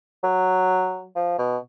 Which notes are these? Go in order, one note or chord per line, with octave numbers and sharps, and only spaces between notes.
F#3
F3
B2